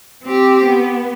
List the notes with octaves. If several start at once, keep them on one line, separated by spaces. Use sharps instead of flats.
C4 G4
B3